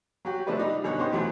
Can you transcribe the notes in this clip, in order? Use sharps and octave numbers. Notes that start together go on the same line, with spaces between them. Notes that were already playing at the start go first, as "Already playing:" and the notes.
F#3 F#4 G4
C3 F3 A3 D4 G#4 B4
G3 D#4
F#2 B2 D3 B3 D#4 C#5
B3 C#4 D#4 G4 C5
E2 C3 F#3 A3 B3